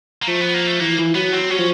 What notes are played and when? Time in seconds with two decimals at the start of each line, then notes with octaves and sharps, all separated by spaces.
0.22 A#3
0.27 F3 A3
0.41 B3
0.54 A#3
0.67 A3
0.80 E3 A#3
0.98 E3
1.15 F#3 B3
1.33 F#3 C4
1.50 F#3 C#4
1.59 F3